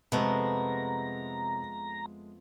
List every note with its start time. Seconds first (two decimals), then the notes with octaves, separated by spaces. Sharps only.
0.12 F2 C3 G#3 A3 B3 A#5